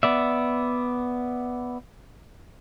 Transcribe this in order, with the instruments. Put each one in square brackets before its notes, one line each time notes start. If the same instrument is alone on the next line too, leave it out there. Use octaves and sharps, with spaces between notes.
[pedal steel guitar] B3 D5 E5